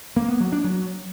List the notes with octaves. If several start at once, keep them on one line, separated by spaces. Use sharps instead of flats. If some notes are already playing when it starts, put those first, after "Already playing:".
A#3
B3
F#3
D4
F#3